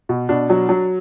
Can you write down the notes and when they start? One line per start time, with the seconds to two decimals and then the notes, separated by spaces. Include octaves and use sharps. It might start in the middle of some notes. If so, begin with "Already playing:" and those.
0.09 B2
0.29 B2 D4
0.50 F#3
0.69 F#3